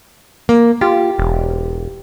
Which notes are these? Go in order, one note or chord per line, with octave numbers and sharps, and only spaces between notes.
A#3
F4 G4
E1